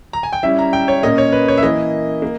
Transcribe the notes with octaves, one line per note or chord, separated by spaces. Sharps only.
A#5
G#5
G5
G3 C#4 E4 E5
A#5
G5
C#5
A#2 A#3 C#4 D#5
C#5
B4
C#5
E5
E3 A#3 E4 D#5
A#3